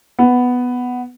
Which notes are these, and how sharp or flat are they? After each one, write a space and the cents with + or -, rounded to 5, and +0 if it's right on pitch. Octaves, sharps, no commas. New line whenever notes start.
B3 +5